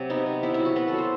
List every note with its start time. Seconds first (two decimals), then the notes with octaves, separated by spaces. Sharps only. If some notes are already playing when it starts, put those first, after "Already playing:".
Already playing: C3 F#3
0.10 B3 D#4
0.26 C3
0.43 B3 E4
0.54 E4
0.59 F#3
0.65 F#4
0.76 B3 B4
0.88 F#3 A4
0.98 C5